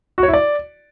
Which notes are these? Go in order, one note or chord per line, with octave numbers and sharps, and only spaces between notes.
F#4
C#5
E4
D5